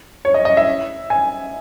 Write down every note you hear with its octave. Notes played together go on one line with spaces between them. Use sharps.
C#5
D#5
D#5
E5
G#5